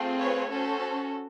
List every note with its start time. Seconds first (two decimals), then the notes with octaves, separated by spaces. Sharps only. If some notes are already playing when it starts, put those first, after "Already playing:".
Already playing: A3 C4 F4 G#4
0.19 B4 C#5
0.50 C#4 F#4 A4 C5